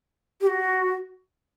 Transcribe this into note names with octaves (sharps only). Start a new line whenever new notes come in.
G4
F#4